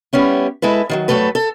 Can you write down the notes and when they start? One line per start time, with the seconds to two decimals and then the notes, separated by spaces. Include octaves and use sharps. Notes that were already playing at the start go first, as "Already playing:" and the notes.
0.13 G3 B3 C#4 E4
0.62 G#3 E4 A4 B4
0.90 D#3 F3 F#3
1.08 E2 G2 F#3 A3 A4 B4
1.35 A4